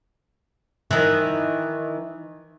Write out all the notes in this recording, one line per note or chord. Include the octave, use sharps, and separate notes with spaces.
D#3 E3